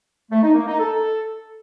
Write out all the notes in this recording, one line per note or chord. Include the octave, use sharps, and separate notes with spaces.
A3
D#4
A#3
D#4
A4